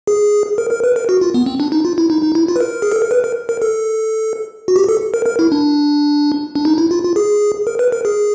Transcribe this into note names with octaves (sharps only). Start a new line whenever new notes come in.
G#4
A#4
A#4
B4
A#4
F#4
F4
B3
C4
D4
D#4
F4
E4
D#4
D#4
E4
F4
B4
A#4
G#4
A4
A#4
B4
A#4
A#4
A4
F#4
G4
A4
A#4
A#4
E4
D4
D4
D#4
E4
F4
F4
G#4
A#4
B4
A#4
G#4